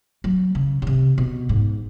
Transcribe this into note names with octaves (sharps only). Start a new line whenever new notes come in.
F#3
C#3
C#3
C3
B2
G#2